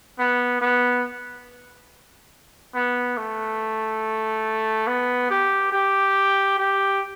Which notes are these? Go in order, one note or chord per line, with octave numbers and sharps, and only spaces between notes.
B3
B3
B3
A3
B3
G4
G4
G4